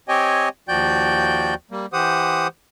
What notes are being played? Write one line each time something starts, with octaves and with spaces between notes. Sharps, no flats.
C4 G4 C#5 D#5 G5 G#5
D#2 F3 F#4 D5 G5 G6
G3 A#3
E3 G4 C5 F#5 D#6